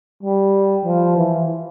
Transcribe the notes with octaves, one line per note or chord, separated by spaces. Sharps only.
G3
F3
E3